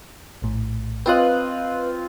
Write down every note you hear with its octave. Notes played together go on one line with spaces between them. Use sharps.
A#1 A2
C4 F4 B4 D#5 F#6